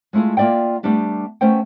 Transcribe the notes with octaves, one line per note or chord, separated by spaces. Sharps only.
G#3 A3 E4 F4 G#4
A#3 F4 D5 E5 G5
G3 A3 B3 D4 G4
A3 B3 C#4 C5 G5